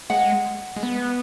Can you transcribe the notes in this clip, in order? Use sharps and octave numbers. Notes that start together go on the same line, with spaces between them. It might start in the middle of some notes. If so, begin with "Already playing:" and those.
G#3 F#5
G#3
B3